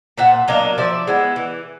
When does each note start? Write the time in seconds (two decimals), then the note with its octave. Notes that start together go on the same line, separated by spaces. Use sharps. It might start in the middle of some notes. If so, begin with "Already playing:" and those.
0.18 A#2 E5 F#5
0.48 F#3 A#3 D4 D#5 F5
0.78 F3 D5 E5
1.07 G#3 B3 E4
1.36 E3